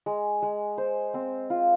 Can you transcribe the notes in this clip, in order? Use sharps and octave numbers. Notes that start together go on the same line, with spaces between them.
G#3
G#3
C5
C4
F4